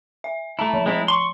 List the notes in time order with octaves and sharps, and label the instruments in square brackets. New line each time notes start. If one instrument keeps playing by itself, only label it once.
[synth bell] E5
[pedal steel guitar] A3 E4 [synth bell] A5 A#5
[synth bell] F3
[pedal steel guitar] G#3 C4 E4
C6 C#6